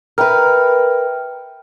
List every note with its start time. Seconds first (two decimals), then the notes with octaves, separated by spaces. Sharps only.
0.18 A#4 B4 E5 G5 F6